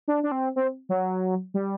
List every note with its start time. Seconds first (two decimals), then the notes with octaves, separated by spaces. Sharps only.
0.08 D4
0.23 D4
0.32 C4
0.56 C4
0.89 F#3
1.54 G3